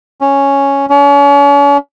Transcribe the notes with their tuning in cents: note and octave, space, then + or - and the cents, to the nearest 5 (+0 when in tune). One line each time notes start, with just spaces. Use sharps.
C#4 +0
C#4 +40